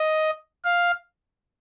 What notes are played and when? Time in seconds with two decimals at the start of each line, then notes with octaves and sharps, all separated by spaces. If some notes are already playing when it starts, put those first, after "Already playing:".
Already playing: D#5
0.65 F5